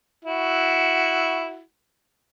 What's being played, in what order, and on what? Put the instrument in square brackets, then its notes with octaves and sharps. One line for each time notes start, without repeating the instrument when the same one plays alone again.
[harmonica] E4 F#4